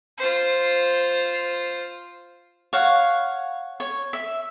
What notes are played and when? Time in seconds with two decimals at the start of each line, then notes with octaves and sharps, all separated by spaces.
0.18 F4 C5
2.73 C#5 F5 F#5
3.80 C#5
4.13 E5